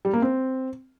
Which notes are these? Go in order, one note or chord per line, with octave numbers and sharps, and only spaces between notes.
G3
A#3
C4